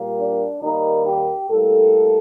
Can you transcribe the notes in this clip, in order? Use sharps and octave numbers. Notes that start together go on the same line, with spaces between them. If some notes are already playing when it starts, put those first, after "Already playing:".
Already playing: A#2 G3 A#3
D4
D#2 D#3 G3 A#3 D#4
G4
A2 G3 A#3 A4